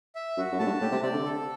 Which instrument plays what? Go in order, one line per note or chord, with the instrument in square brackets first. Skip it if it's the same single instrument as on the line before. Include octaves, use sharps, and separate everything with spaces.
[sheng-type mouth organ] E5
[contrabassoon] F#2 [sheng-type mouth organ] F#4
[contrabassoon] F#2
[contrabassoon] A2 [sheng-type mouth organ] A5
[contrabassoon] G2
[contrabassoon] A2 [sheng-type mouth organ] G4
[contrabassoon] C3
[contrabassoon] C3 [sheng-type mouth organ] D5
[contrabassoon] D3
[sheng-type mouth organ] A4